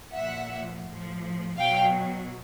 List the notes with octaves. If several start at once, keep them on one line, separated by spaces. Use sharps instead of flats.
A#2 F3 E5 F#5
A2 F3
B2 F#3 F5 G5